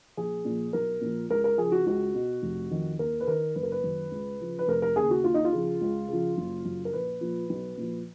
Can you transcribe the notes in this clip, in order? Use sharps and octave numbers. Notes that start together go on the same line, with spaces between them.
A#1 G#4
A#2 F3
B1 A#4
A#2 F3
C#2 A#4
A#4
C#3 F3 G#4
F#4
C#2 F#4
B2
F1
F2 D#3
D#2 A#4
B4
D#3 A#4
F#1 B4
A#4
B4
F#2 D#3
C#2
C#3 F3
B4
F1 A#4
A#4
D#2 C#3 G#4
F#4
D#2 F4
D#4
F4
C#3 F3
C#2
C#3 F3
F#1
F#2 C#3
A#4
A#1 B4
A#2 F3
B1
A#2 F3